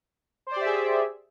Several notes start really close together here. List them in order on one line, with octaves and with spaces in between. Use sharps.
C5 D5 G4 E5 G#4